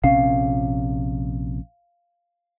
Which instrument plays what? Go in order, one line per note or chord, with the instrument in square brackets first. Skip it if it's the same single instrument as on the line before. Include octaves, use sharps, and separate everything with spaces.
[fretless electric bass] A#1 C3 C#4 [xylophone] F5